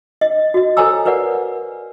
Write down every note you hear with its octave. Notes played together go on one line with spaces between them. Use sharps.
D#5
F#4 D#5
A4 C5 C#5 G#5 A#5 E6
A#4 B4 C#5 D5 F#5